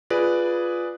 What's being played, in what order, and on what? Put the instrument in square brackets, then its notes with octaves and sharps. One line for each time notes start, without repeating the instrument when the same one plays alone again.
[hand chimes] F4 [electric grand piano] G#4 B4 D5